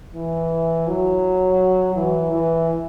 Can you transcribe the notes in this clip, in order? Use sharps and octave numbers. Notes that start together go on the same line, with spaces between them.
E3
F#3
E3
E3